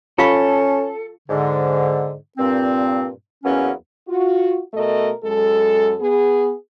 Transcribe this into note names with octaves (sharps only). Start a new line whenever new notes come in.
C#4 F4 A4 F5 C#6
G#2 D3
G2 A#2 C4
E2 F#3 A#3 B3 C#4
F4 F#4
B2 A3 A4 A#4 D#5
F#2 G#3 A4
B3 G#4